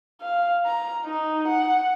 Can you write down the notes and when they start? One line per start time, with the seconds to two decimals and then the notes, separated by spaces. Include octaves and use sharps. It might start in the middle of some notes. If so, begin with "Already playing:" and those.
0.21 F5
0.66 A#5
1.05 D#4
1.48 F#5